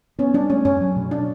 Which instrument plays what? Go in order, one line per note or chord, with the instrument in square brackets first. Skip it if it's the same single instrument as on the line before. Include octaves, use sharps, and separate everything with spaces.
[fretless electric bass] B3 [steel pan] C#4
[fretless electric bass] G3 [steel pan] D4
[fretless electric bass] A3 [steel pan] C#4
[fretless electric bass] F#2 [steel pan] C#4
[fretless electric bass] F#3
B2
[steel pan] D4